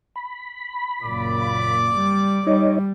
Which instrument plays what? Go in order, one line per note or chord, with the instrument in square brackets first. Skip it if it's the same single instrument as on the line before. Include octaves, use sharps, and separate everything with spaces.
[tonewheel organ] B5
[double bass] F#1 A#2 [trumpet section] D5 D6
[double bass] G3
[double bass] G3 [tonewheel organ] D#4 C#5 D#5